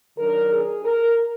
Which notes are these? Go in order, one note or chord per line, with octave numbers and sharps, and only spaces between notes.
D#3 F#3 D4 A#4
G#4
A#4